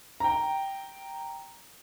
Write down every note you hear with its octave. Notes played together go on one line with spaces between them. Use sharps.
G5 A#5